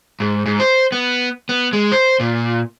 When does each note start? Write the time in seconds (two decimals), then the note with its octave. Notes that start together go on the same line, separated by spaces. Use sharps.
0.20 G#2
0.46 G#2
0.60 C5
0.92 B3
1.49 B3
1.73 G#3
1.92 C5
2.20 A#2